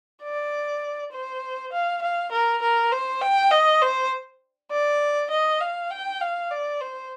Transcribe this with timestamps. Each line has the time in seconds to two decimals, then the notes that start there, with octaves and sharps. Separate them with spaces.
0.23 D5
1.12 C5
1.72 F5
2.02 F5
2.32 A#4
2.62 A#4
2.92 C5
3.21 G5
3.51 D#5
3.82 C5
4.71 D5
5.31 D#5
5.61 F5
5.91 G5
6.21 F5
6.51 D5
6.80 C5